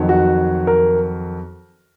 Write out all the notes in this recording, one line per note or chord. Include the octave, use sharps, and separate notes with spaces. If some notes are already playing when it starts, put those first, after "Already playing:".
Already playing: F2 D#3 F#3
F#4
A#4